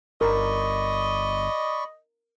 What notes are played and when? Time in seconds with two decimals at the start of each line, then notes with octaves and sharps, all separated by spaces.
0.21 G1 A#4 D5 D#5 B5 C#6